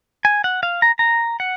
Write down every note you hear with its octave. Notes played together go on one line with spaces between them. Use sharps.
G#5
F#5
F5
A#5
A#5
F#5